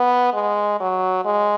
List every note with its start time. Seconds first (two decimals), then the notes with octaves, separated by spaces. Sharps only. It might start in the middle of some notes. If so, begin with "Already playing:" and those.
Already playing: B3
0.34 G#3
0.81 F#3
1.25 G#3